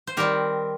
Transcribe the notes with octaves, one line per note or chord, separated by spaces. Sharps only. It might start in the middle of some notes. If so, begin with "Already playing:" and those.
C5
D#3 G3 C4 G4 A#4